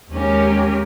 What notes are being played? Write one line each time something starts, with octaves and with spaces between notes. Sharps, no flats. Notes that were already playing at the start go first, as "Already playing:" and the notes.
D#2 G#3 C#4 G4 A#4